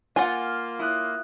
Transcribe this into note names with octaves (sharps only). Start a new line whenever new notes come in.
A#3 F4 F#5 G#5
E4 D#6 F#6